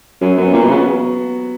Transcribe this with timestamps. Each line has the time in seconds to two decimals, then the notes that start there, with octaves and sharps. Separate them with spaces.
0.21 F#2 F#3
0.38 F#2 B3 F#4
0.53 A#2 F#3
0.62 B2
0.70 C#3 B3 F#4